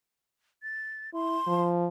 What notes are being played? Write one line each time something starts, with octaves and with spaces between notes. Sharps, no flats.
A6
E4 C6
F3